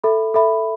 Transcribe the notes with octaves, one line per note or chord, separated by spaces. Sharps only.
A4 E5 B5
A4 E5 B5